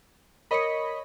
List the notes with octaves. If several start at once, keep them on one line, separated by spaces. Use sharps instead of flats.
A#4 C#5 D#5 B5 C#7